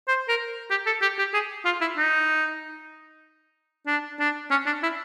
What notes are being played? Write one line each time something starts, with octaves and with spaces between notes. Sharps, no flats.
C5
A#4
G4
A4
G4
G4
G#4
F4
E4
D#4
D4
D4
C#4
D4
E4